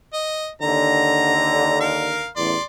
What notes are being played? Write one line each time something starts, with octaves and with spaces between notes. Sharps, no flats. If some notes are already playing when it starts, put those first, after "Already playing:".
D#5
D#2 D3 A#5
A#4 F5
A1 E2 D5 C6